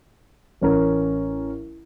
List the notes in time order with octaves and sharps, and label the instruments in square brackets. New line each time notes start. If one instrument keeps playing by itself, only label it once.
[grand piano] A1 C#4 A#4